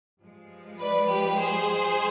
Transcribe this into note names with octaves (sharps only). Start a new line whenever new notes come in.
G2 F3 G#3
B4 D5
G4 B4
G#4 C5